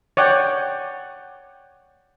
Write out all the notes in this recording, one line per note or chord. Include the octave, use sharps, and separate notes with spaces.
C#5 D5 F#5 G5